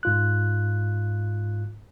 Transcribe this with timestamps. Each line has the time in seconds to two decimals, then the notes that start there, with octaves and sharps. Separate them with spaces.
0.03 G#2 F4 F#6